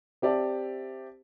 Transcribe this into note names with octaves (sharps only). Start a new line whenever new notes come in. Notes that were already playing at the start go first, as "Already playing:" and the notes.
C4 G4 D5 E5 A5